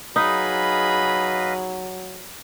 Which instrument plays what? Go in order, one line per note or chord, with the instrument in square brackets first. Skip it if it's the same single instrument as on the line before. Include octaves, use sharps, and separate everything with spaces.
[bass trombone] F#3 [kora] D#4 [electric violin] G#4 B5 [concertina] B4 D#5 F5